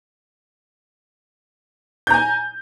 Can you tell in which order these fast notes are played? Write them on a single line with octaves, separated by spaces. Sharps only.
G6 A#5 G#5